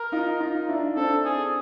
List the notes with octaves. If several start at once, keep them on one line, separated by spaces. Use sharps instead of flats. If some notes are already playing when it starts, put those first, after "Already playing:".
Already playing: A#4
D#4 F4
D#4 F4
D4 E4
C4 D4 A4
G#4